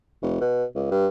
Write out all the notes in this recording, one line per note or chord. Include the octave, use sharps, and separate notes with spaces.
F1
B2
C#2
G2